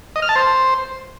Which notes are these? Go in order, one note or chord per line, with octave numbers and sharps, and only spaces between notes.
D#5
F6
A5
C5